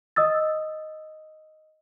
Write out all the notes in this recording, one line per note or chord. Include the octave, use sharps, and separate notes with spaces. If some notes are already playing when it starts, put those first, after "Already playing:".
D#5 D#6 E6 A6